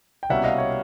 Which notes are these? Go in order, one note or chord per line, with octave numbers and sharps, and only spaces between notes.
G5
C2 B2 G3 A#3 C#4 E5 F#5
D#5 F5
C#5